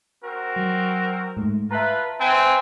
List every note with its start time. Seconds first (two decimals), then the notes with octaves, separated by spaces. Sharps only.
0.24 C4 F#4 A#4
0.56 F#3
1.37 G#2 A3
1.71 F4 B4 E5 A5 A#5
2.20 C4 B4 G#5